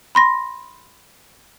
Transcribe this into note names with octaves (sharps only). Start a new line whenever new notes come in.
B5 C6 A#6